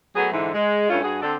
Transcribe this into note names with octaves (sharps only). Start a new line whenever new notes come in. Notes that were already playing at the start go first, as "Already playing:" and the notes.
F#3 A3 B3 G#4
G#2 D3 E3
G#3
G2 A3 C#4 F4
G2 F#4 G#4
D3 C4 A4 D5